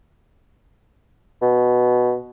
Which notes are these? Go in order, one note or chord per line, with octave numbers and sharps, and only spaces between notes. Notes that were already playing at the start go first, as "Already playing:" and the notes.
B2